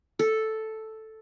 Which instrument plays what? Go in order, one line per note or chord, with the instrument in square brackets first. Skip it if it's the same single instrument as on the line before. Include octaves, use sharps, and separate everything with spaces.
[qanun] A4